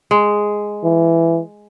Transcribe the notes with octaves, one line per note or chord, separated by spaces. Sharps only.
G#3
E3